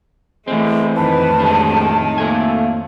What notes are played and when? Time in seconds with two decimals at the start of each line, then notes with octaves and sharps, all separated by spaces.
0.48 E2 A2 E3 G#3 A3 C4
0.97 F2 A2 D#3 B4 A5
1.40 A1 C3 G#3 A3 D4
2.18 F3 A3 A#3 G#5